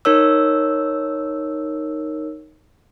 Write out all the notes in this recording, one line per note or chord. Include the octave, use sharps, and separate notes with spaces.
D#4 A#4 C#5 E6